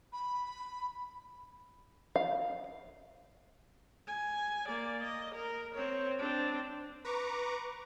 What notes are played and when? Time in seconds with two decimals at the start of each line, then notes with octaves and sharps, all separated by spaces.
0.13 B5
2.16 F5
4.07 G#5
4.68 A#3 D5
5.04 D#5
5.35 A#4
5.75 C4 C#5
6.19 C4 D4
7.05 B4 A#5 C#6 D6